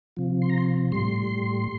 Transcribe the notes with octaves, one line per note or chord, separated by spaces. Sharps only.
C3 F3
C6
A#5
C6
A2 G3 C6